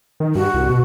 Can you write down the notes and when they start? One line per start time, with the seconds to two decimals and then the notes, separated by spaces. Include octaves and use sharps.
0.20 D#3
0.35 G2 F#4
0.54 C2
0.69 B2